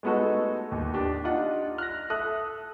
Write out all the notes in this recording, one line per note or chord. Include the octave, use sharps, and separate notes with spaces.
G#3 A3 B3 D#4 F#4 A4
D#2
D4 G4
D4 D#4 F4 F#5
F6 F#6 A#6
A4 E5 D#6 F#6